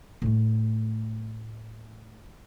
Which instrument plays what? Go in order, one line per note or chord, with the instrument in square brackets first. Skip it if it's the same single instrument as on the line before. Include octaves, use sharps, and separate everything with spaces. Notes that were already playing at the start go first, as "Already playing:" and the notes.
[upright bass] A2 A3